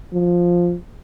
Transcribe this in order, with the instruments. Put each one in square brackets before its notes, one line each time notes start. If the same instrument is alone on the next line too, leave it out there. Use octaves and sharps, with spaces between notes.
[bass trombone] F3